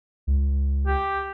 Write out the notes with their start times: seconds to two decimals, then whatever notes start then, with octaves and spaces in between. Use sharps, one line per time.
0.27 C#2
0.87 G4